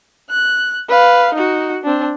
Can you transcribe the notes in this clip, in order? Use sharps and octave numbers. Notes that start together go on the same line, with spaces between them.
F#6
B4 F5
D#4 F#4
C4 D4